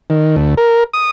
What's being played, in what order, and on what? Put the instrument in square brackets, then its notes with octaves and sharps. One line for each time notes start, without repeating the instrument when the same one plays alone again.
[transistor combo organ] D#3
D2
A#4
D#6